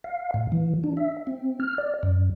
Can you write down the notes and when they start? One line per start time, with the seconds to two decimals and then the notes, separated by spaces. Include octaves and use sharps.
0.04 F5
0.34 A2
0.52 E3
0.84 D4
0.97 E5
1.27 C4
1.60 F6
1.78 D5
2.03 F#2